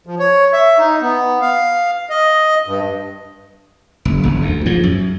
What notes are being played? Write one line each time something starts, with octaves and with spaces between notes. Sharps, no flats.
F3
C#5
E5
D#4
B3
F5
D#5
G2
F#1
F#1
D2
G#2 F3
F#2